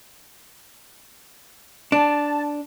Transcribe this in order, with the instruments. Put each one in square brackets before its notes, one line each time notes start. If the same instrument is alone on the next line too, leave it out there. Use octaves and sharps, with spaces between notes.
[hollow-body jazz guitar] D4 [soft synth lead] A5